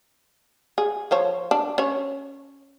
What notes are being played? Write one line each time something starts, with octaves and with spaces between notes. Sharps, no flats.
G#4
F3 C5 C#5
D4
C#4 C#5